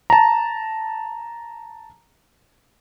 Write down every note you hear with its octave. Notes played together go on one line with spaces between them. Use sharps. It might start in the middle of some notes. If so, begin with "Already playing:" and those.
A5 A#5